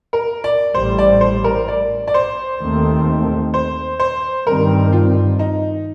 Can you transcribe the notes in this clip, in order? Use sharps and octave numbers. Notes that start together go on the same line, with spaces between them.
A#4
D5
A1 A2 G3 C5
D5
C5
A#4
D5
D5
C5
D#2 D#3 A3 C4
C5
C5
G2 D#3 G3 C4 A#4
F4
D#4